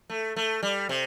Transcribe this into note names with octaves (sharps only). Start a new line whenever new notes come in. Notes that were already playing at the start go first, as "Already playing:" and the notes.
A3
A3
G3
C3